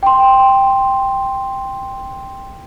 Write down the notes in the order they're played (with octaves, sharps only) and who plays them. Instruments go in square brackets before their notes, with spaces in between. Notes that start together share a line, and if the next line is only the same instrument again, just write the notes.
[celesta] G5 C6